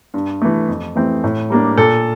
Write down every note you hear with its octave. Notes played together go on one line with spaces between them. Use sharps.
G2
E3 A3
F2
E3 A3 C4
A2
G3 A#3 D4
A#2 A4